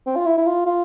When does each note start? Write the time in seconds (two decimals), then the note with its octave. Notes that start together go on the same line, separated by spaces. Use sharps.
0.06 C4
0.16 F4
0.26 E4
0.38 E4
0.47 F4
0.66 F4